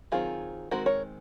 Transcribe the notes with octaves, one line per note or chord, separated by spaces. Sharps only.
D#3 F#3 C4 F4 G#4
D#3 G#3 C4 F#4 A#4
A#4 C#5